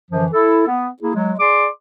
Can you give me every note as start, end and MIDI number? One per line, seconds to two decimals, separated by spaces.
0.11 0.26 42
0.11 0.26 50
0.11 0.26 52
0.11 0.26 53
0.32 0.64 64
0.32 0.64 69
0.68 0.89 59
1.03 1.14 58
1.03 1.14 64
1.03 1.14 68
1.15 1.33 54
1.15 1.33 56
1.40 1.67 68
1.40 1.67 74
1.40 1.67 84
1.40 1.67 86